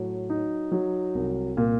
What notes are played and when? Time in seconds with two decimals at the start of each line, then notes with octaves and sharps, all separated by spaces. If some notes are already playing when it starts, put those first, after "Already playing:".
Already playing: A2 F#3
0.30 D#4
0.72 F#3
1.15 C2
1.57 A#2